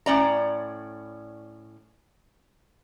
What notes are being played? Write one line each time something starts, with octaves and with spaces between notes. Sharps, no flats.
A2 C#4 D5 A#5